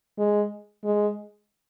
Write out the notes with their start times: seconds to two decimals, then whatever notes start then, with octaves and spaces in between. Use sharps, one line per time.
0.18 G#3
0.84 G#3